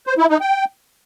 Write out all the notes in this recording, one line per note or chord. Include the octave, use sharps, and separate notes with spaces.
C5
E4
D#4
G5